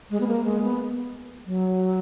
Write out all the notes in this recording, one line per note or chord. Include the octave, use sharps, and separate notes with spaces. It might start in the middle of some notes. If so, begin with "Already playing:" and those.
G#3
B3
A#3
G#3
B3
F#3